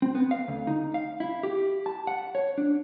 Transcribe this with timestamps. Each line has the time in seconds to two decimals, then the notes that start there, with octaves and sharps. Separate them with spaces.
0.02 C4
0.15 B3
0.31 F5
0.48 D2
0.67 D#4
0.94 F5
1.20 E4
1.43 G4
1.86 A5
2.07 F#5
2.35 C#5
2.58 D4